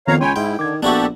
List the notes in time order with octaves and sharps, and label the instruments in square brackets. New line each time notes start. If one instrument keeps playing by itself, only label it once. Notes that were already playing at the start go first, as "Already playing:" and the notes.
[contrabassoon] F2 [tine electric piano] D#3 B3 [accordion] C#5 F5 A#5
[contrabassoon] C#2 [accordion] C#5 G5 G#5 [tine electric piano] B5 C6
[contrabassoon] G#2 [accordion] E4 [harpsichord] G5
[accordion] D3 [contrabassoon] D#3 [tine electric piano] D6 G#6
[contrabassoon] A#1 [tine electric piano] B3 [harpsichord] D4 E4 F#4 [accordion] G4 A4